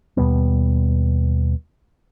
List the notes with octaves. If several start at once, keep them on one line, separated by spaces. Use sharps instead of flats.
D#2 B2 G3 B3